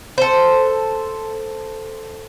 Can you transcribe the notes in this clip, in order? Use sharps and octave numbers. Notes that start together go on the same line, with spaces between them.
A4 C5